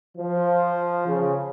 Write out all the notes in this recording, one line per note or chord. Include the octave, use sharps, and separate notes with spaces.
F3
C#3